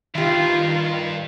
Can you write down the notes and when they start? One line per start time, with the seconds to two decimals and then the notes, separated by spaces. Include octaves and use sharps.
0.15 G2 D#3 F4 G4 E5